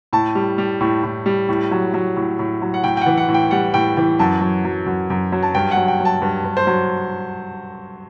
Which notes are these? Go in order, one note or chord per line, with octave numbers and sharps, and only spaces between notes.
A2 A5
G3
G3
A2
A2
G3
A2
F#3
F#3
A2
A2
F#3
F#5
A2 G5
G5
F#5
E3
F#5
A2
G5
G3 F#5
A2 G5
E3 G5
F#2 A5
F#3
F#3
F#2
F#2
F#3
A5
G2 G5
F#5
F#3
G5
F#3
A5
G2
G2
C5
F#3